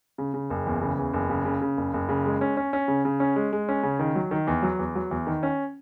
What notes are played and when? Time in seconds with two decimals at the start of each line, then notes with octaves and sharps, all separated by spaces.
0.18 C#3
0.34 C#3
0.50 F#1
0.67 E2
0.82 C#3
0.98 E2
1.14 F#1
1.30 C#3
1.45 C#3
1.61 C#3
1.77 F#1
1.94 F#1
2.09 C#3
2.26 G#3
2.41 C#4
2.57 C#4
2.73 C#4
2.88 C#3
3.05 C#3
3.20 C#4
3.36 G#3
3.53 G#3
3.69 C#4
3.83 C#3
3.99 D#3
4.15 F#3
4.31 D#3
4.47 E2
4.63 F#3
4.79 E2
4.95 F#3
5.11 E2
5.27 D#3
5.43 C#4